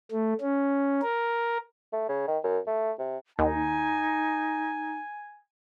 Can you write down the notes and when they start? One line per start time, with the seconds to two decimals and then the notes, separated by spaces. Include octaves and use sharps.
0.11 A3
0.41 C#4
1.02 A#4
1.93 A3
2.09 C#3
2.28 D#3
2.44 F#2
2.67 A3
2.99 C3
3.39 D#2 D#4 G#5